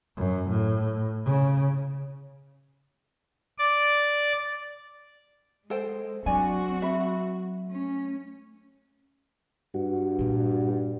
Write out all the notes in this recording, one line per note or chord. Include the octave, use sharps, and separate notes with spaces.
F#2
A2
C#3
D5
G#3 A4 C5 G5
F#3 C4 D4 F#4 D5 G#5
E5 B5
A3 C#4
G2 F#4
A#2 G3